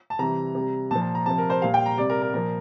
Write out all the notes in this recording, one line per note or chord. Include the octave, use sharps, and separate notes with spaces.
A5
C3 E3 G3 A#5
C3 G3
A#2 F3 A5
A5
A#5
C3 F3 A5
A#4
C5
A#2 G3 F5
G5
A#5
C3 G3 D5
A#4
A#4
A#2 F3 A#4